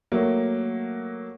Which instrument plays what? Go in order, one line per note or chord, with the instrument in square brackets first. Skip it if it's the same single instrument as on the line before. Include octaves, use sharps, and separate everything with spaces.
[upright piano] F#3 A3 A#3